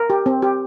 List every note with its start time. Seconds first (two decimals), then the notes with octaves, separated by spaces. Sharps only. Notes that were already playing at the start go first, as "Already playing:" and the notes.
Already playing: A#4
0.10 G4
0.26 C4
0.42 G4